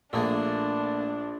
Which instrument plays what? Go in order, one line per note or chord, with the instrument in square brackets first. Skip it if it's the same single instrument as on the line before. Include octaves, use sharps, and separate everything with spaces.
[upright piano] A#1 [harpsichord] A3 A#3 G#4 [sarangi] D4